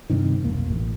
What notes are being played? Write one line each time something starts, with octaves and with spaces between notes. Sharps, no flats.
G2 C3 D#3
B1 F2 A#3
A1